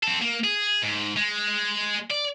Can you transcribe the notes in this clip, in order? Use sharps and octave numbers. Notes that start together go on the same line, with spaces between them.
C4 A4
A#3
G#4
G#2
G#3
D5